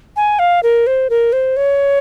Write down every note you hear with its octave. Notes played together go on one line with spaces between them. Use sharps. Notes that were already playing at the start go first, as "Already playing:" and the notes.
G#5
F5
A#4
C5
A#4
C5
C#5